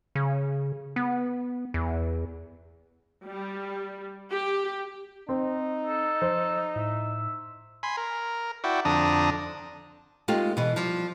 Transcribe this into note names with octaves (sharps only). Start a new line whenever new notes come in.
C#3
B3
E2
G3
G4
C4 D#4
A4
F3 C5
A2 E5
G#5 B5 C6
A#4
E4 F#4 D5 G5
F2 D3 D4 A#5 D#6
G#3 A3 C4 D#4 F4 G4
B2 E3
F3 G3